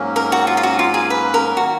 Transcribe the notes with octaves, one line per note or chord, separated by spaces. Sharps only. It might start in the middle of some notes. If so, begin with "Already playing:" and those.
Already playing: G#2 F#3 A#3 C#4
A#4
F#4
F4
F4
F#4
F4
G#4
B4
A#4
D#3 A#3 F#4